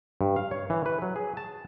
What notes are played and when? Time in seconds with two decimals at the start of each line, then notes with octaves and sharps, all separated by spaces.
0.21 G2
0.36 F5
0.51 C#5
0.70 E3
0.86 B4
1.02 F#3
1.16 G#4
1.37 A5